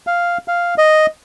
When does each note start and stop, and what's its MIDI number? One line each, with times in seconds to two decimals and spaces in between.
0.07 0.38 77
0.48 0.74 77
0.78 1.06 75